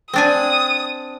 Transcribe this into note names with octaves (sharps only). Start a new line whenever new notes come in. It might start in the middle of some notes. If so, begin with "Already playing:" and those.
C4 D4 G#5 D#6